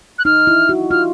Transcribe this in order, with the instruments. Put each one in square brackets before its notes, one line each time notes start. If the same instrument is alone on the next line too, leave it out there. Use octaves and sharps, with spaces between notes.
[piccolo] F#6
[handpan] D#4 [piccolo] F6
[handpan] E4
F#4
[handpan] F4 [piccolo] F6